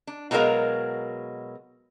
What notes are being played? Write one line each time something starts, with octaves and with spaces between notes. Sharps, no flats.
D4
B2 F#3 G#3 A#3 A#4 F5